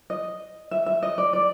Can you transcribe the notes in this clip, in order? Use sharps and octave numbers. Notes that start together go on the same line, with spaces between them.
D#5
E5
E5
D#5
D5
D5